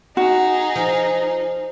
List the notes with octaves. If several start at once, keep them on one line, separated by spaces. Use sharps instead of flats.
D#4 F#4 G#4
F3